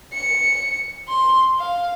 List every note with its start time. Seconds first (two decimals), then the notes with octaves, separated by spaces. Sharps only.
0.13 C#7
1.08 C6
1.59 F5